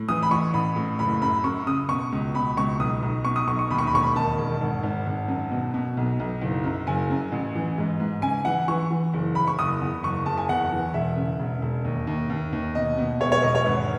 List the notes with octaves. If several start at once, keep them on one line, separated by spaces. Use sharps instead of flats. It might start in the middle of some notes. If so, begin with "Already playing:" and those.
Already playing: A2
E3 D#6
B5
A1 C#6
A1 B5
A2
F#1 B5
F#2 B5
F#2 C#6
C#3 D#6
B2 C#6
C#2
B2 B5
C#2 C#6
B1 D#6
B1
B2 C#6
D#6
B1 C#6
C#6
D#2 B5
C#6
B5
E1 C#6
B5
D#3 A5
E1
G#1
G#1
G#1
F#2
B2
B2
B1
B1
F#1
F#2
F#1 G#5
F#2
A1
E3
G#2
G#2
C#3 G#5
E3 F#5
E3 C#6
E3
F#1
F#1 B5
C#6
F#1 D#6
E2
F#1 C#6
F#1 A5
G#5
E2 F#5
E3
E1 E5
C#3
E1
E1
D#2
D#2
D#2
D#2
B2 D#5
B2
E1 C#5
C#5
E1 D#5
C#5
G#1 B4